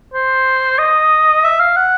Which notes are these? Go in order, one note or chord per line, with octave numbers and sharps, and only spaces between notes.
C5
D#5
E5
F5
F#5